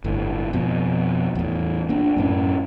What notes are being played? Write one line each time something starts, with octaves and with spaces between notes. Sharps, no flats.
G1 A2
F2 B2
E2 A2
A#3 D4
F#2 A2 C#4